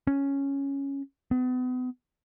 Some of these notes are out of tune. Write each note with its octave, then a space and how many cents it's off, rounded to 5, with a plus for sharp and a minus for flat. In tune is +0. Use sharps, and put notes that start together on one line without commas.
C#4 +0
B3 +35